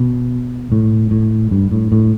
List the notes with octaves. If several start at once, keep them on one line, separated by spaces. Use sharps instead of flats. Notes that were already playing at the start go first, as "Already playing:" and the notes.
Already playing: B2
A2
A2
G2
A2
A2